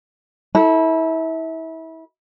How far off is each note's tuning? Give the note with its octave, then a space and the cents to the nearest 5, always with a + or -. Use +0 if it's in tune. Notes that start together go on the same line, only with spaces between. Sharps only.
E4 -30 A4 +0